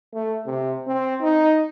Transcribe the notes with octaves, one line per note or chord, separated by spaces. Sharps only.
A3
C3
C4
D#4